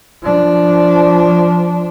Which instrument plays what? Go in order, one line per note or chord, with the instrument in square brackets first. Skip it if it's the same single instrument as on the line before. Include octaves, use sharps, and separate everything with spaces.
[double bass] F3 D4